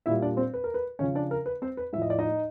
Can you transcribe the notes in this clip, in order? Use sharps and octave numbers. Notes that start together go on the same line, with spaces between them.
A#2 G3 E4 E5
D4 D5
C4 C5
B4
A#4
B4
C#3 F3 C#4 C#5
D4 D5
A#4
B4
C4 C5
B4
A2 F3 D#5 E5
D5
D#4 D#5